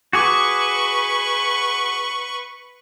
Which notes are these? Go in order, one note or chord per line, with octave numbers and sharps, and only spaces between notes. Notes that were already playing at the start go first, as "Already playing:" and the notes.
F#4 G#4 B4 C#6 D6